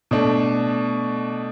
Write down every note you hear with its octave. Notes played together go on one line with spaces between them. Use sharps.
B2 A3 D4